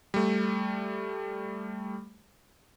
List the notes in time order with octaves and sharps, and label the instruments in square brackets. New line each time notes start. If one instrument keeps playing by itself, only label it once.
[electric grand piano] G3 A3